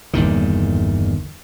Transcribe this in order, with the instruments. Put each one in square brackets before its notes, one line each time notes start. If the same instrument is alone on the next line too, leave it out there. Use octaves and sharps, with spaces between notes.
[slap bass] G1 E2 A#2 D#3